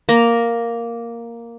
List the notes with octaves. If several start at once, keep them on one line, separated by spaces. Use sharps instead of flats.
A#3 A#5